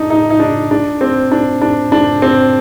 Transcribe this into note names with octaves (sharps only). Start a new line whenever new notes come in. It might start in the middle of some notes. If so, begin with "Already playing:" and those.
Already playing: D4 D#4
D#4
D#4
D4
D4
C4
D4
D4
D4
C4